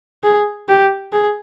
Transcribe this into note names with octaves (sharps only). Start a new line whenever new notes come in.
G#4
G4
G#4